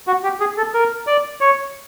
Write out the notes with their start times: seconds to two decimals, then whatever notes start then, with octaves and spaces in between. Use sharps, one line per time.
0.07 F#4
0.24 G4
0.40 G#4
0.57 A4
0.74 A#4
1.07 D5
1.41 C#5